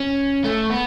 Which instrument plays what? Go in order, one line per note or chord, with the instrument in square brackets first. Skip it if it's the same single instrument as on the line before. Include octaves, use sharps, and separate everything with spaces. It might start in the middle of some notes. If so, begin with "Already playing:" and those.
Already playing: [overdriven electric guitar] C#4
A3
B3